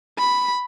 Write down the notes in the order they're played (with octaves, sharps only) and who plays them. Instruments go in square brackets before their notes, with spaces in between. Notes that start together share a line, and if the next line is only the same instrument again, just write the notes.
[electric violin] B5